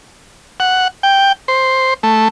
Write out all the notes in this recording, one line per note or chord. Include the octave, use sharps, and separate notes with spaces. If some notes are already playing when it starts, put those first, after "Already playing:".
F#5
G5
C5
A3